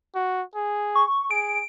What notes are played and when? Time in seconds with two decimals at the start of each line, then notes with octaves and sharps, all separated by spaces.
0.15 F#4
0.55 G#4
0.95 C#6
1.31 G#4 D7